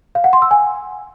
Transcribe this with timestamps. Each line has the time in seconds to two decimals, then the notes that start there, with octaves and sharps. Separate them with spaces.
0.15 F5
0.24 F#5
0.33 C6
0.42 E6
0.51 G#5